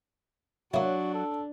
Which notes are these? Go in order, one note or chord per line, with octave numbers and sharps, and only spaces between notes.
F#3 A#3 D4 E4 F#4
A4